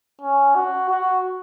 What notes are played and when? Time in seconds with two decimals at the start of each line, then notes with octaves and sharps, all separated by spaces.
0.21 C#4
0.55 F#4
0.90 F#4